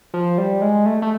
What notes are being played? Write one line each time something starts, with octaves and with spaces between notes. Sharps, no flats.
F3
G3
G#3
A3
A3